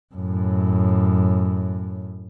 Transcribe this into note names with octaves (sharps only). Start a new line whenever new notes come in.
F#2 A2